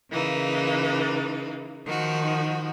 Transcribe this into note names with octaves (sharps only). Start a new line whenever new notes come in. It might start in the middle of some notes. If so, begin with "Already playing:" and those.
C#3 E3 A#3 D#4
D#3 F3 F#4